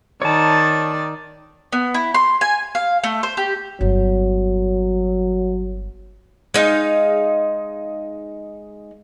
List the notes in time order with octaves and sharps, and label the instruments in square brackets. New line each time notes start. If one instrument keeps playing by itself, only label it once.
[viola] D#3 D5 [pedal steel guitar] C#5 A5
[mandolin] B3
E4
C6
G#5
F5
A3
C5
G4
[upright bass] G1 [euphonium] F#3
[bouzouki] G#3 D#4 F5